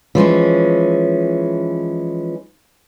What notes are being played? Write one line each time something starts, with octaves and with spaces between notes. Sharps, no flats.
E3 F3 G#3 C#4